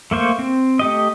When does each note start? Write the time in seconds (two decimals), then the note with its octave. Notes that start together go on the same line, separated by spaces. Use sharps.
0.11 A3 A#3 C5 C#6
0.39 C4
0.79 A3 G4 D#5